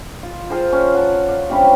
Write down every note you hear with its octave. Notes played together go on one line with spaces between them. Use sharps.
F4
F4 G#4 A#4 C5
C#4
F#5 A5
F4 D5
G2 C3 C#4 B5